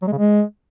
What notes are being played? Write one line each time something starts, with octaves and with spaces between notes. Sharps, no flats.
F#3
G#3
C#3
G#3